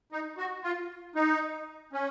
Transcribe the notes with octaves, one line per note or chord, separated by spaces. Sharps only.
D#4
F#4
F4
D#4
C#4